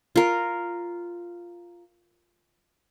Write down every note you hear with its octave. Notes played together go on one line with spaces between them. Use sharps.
F4 A#4